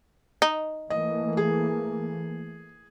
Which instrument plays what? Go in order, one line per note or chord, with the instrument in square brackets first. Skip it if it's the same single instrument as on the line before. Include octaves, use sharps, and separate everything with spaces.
[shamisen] D#4
[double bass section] E3 A3 A#3 [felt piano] D#5
[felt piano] G#4